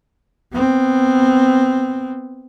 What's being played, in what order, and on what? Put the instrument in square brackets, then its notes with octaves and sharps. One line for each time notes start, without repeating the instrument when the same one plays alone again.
[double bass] B3 C4